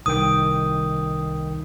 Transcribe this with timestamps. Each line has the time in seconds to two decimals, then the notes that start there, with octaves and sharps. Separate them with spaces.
0.06 C2 D#3 G5 D#6